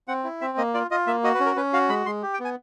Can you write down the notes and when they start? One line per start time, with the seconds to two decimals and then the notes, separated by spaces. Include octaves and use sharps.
0.08 C4 F#5
0.24 E4
0.41 C4 E5
0.58 A#3 D#5
0.74 F4 D5
0.91 F4 D#5
1.07 A#3 E5
1.24 F#4 D#5
1.34 B4
1.40 C#4
1.46 A#4
1.56 C#4 B4
1.73 F#4 F5
1.89 G#3 B5
2.06 G#3 C6
2.23 G4
2.34 G5
2.39 B3
2.45 G#5